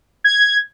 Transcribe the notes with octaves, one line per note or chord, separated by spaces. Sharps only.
G#6